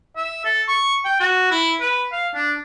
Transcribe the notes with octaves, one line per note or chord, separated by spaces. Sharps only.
E5
A4
C#6
G5
F#4
E4
B4
F5
D4